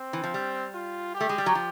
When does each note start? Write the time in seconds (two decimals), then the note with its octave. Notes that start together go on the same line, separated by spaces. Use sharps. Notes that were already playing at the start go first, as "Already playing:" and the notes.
Already playing: C4
0.13 E3
0.24 F3
0.34 G3
0.74 F4
1.15 G4
1.21 A3
1.29 G#3
1.38 G3
1.46 F#3
1.55 F3